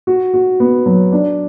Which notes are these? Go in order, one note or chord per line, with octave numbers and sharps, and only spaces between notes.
F#4
F#4
B3
F#3
D4